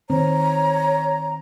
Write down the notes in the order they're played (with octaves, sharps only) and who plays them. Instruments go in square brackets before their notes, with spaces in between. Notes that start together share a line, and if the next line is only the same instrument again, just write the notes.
[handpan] D#3 C4 [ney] C#5 [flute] A#5